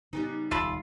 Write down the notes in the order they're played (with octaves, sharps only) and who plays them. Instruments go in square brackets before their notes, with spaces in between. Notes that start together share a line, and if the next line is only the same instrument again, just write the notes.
[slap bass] C#3 [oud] G3 B3 D#4
[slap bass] D#1 C#2 [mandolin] F4 [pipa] A4 E5 B5